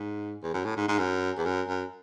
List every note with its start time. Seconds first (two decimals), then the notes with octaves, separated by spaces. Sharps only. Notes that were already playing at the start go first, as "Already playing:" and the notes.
Already playing: G#2
0.43 E2
0.54 F#2
0.65 A2
0.77 G#2
0.88 G#2
0.99 F#2
1.38 E2
1.45 F#2
1.68 F#2